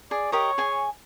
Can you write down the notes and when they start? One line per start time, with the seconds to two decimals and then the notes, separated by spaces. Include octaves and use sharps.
0.11 G#4 D5
0.32 G4 A#4 C#5 D#5
0.58 G#4 G#5